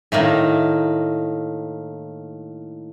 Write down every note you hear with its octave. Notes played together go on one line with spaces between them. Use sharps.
A2 D#3 A#3